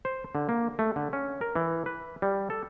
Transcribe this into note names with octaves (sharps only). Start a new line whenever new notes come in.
C5
D3
A#3
A3
D3
C#4
A#4
E3
B4
G3
A4